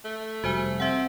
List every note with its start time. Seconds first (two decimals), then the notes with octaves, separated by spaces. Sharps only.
0.05 A3
0.44 F1 G3 F#4 C5 G#5
0.80 C4 E5 F#5